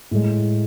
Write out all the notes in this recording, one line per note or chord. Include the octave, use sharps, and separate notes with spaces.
A2 G#3